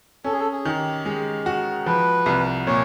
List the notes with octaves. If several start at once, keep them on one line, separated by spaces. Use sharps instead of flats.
C#4 A4
G#4
A4
G#4
D#3
G4
G#3
F#4
F3 B4
C2
A#2 C#5